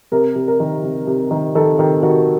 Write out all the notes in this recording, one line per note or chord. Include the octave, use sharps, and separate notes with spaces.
C3 A#4
C3
A#4
D#3
C3
C3
D#3
D#3 A4
D#3 G4
D#3 F#4